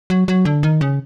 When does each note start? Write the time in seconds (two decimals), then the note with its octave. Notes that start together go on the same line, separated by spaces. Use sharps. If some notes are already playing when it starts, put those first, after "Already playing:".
0.10 F#3
0.28 F#3
0.45 D3
0.63 D#3
0.81 C#3